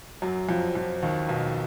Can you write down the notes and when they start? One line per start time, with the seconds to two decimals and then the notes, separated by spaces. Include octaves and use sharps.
0.22 F#2 F#3
0.49 F2 F3
0.75 F2 F3
1.03 D#2 D#3
1.29 B1 B2